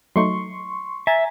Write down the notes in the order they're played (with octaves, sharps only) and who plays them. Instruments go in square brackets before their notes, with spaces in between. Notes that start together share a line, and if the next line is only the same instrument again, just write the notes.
[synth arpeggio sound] F#3 A3 D#4 [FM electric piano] C6 C#6
[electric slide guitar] E5 [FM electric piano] G#5 A#5 A6